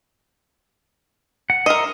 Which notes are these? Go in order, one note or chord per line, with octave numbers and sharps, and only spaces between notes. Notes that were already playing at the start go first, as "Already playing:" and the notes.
F#5
A#4 C5 D#5 E5 F6